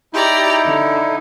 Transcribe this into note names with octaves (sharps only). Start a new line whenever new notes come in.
D#4 E4 G4 D5 A#5
D3